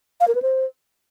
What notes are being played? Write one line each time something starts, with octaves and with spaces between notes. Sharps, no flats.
F5
A#4
B4
C5